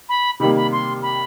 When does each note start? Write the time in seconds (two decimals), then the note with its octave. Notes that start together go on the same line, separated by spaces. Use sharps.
0.09 B5
0.40 C3 D#3 G3 A#3 B5
0.56 B5
0.72 C6
1.02 B5